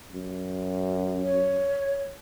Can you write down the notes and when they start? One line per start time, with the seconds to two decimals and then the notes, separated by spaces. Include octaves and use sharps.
0.12 F#2
1.23 C#5